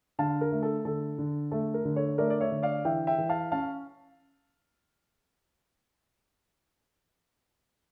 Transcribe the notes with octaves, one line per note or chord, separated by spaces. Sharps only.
D3 F5 A5
A#4
A3
A4
D3 A4
D3
A3 A4
A#4
D3
A4 C#5
A3 A#4 D5
D5
C#5 E5
D3
D5 F5
E3 E5 G5
E5 G5
E3
F5 A5
C#4 F5 A5